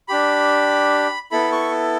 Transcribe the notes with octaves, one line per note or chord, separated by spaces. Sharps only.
D4 G4 B5
B3 E4 A4 B5
C#6